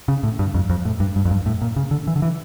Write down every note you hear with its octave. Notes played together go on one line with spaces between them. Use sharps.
C#3
A2
G2
F2
F2
A2
G2
G2
F2
G2
A2
A#2
C#3
D3
E3
D3
E3